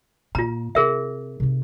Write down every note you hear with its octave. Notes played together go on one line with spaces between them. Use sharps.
A#2 F4 A#5
C3 G#4 A#4 E5
C3 D#4